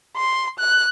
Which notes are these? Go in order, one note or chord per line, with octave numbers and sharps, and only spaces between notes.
C6
F#6